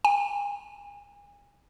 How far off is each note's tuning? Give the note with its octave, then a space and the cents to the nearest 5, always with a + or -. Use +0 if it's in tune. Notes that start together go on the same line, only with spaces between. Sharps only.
G#5 -35